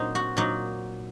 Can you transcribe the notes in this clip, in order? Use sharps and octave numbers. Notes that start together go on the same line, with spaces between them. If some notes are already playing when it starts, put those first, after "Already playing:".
Already playing: A#2 F#3 C4 D#4
F#4
A#2 F#3 D#4